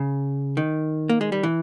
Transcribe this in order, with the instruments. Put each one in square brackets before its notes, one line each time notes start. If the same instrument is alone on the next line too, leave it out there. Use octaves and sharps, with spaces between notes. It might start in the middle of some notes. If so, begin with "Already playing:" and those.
Already playing: [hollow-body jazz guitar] C#3
D#3
A#3
G#3
G3
E3